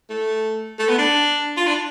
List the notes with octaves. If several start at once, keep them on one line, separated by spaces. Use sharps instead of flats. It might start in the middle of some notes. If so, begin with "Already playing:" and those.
A3
A3
B3
D4
F4
D4